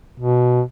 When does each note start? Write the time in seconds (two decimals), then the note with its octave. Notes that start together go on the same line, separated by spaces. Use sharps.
0.20 B2